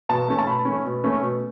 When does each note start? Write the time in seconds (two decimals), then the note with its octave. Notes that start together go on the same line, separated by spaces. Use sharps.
0.09 B2 A5
0.28 A3 C#4
0.39 A5
0.47 B2 B5
0.65 A3 C#4
0.85 B2
1.04 A3 C#4
1.22 B2